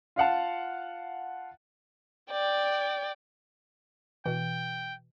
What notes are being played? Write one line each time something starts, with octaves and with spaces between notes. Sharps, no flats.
F4 F5 F#5 A5
D5 G5
B2 E3 G5